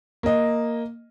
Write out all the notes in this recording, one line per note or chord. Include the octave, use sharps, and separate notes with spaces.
A#3 D#5